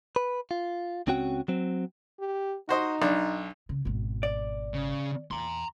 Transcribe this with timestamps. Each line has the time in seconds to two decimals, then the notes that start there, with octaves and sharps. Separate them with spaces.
0.16 B4
0.51 F4
1.07 C#2 C4 C#4 F#4 G5
1.48 F#3 C4
2.20 G4
2.69 D#4 F#4 C5 D#5
3.02 B1 D4
3.69 C#3
3.85 G#1 B2
4.23 D5
4.74 C#3
5.31 E2 A#5 C6